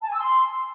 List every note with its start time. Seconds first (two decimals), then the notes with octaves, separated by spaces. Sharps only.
0.01 A5
0.08 G#5
0.14 E6
0.20 C6